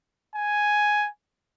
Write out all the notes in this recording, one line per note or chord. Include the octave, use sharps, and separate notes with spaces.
G#5